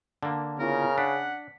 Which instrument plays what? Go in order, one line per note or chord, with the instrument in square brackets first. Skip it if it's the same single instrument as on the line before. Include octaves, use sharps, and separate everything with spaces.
[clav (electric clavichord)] D3 A#3 [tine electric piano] A5
[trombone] C#3 [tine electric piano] B3 E4 F4 [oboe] A#4
[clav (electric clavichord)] D4 [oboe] F#5 [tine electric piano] B6